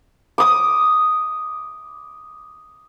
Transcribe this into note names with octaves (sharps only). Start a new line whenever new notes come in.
D6 D#6